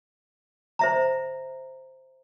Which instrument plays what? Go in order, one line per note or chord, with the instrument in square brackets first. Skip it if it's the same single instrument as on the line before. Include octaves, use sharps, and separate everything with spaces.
[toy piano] C5 E5 A#5